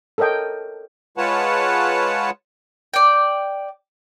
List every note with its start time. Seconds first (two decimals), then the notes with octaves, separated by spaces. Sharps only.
0.18 A4 A#4 C#5 D#5 G5
1.17 G#3 F4 B4 C#5 F#5 A5
2.94 D5 G5